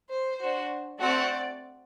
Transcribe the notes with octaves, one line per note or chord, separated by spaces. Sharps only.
C5
D4 F#4 C5
A3 C4 F#4 C5 D5 F#5